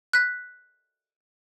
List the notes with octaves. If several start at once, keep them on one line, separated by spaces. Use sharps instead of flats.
F#6 B6